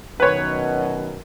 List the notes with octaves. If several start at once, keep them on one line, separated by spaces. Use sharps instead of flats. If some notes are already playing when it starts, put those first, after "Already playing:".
F#2 B2 D#3 B4 C#5